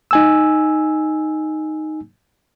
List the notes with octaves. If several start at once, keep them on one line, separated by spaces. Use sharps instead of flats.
D#4 G#5 E6